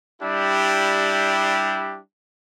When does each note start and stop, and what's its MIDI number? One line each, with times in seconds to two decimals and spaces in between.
0.22 2.00 55
0.22 2.00 62
0.22 2.00 64
0.22 2.00 67